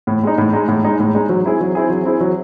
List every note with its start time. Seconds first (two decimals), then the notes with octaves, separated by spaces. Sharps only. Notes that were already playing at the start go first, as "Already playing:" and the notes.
0.07 A2
0.23 G#3 D#4
0.38 A2
0.53 G#3 D#4
0.68 A2
0.84 G#3 D#4
0.99 A2
1.15 G#3 D#4
1.29 F#3
1.45 C4 E4 G#4
1.61 F#3
1.75 C4 E4 G#4
1.90 F#3
2.05 C4 E4 G#4
2.20 F#3